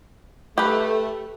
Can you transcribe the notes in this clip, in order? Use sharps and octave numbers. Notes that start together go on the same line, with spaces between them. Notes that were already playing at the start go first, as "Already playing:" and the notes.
A3 G4 B4